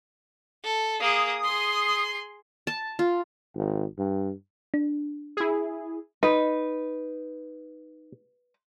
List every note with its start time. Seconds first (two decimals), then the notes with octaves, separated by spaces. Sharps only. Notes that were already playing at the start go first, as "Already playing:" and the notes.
0.64 A4
1.00 A#3 G#4 D#6
1.44 G#4 C6
2.67 A5
2.99 F4
3.55 G#1
3.98 G2
4.74 D4
5.37 E4 G#4
6.23 D#4 B4